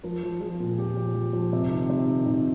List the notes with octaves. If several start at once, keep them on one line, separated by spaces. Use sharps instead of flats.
F3 A#4
F3
F3 G#4
A#2
A#2 G4
F3
F3
F3
C3
D#3
C3
D#3
C3 D#4